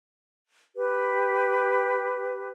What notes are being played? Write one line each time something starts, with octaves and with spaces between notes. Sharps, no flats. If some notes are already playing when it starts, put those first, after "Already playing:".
G4 B4